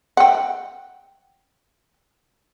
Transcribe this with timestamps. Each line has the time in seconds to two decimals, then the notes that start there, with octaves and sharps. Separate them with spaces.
0.17 F#5 G5